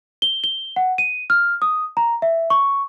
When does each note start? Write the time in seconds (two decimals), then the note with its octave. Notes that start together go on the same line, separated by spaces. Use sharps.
0.22 G7
0.44 G7
0.76 F#5
0.98 D#7
1.30 F6
1.62 D#6
1.97 A#5
2.22 E5
2.50 C#6